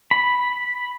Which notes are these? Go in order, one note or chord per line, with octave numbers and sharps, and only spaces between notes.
B5